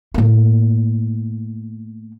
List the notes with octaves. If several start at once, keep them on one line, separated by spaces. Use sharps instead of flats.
A2 A#3